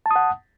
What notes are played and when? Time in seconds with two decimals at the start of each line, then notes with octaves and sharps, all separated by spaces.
0.06 A5
0.11 D#6
0.16 F#5